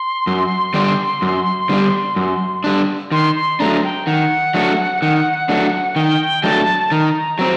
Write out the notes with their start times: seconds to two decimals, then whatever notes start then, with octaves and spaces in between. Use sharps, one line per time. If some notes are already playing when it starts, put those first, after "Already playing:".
Already playing: C6
0.27 F#2
0.74 D3 G3 D4
1.22 F#2
1.69 D3 G3 D4
2.16 F#2
2.64 D3 G3 D4
3.12 D#3 C6
3.35 C6
3.60 F#3 A3 D4 A#5
3.83 G5
4.07 D#3 F#5
4.54 F#3 A3 D4
5.02 D#3
5.49 F#3 A3 D4
5.96 D#3 G5
6.44 F#3 A3 D4 A5
6.92 D#3 A#5
7.39 F#3 C4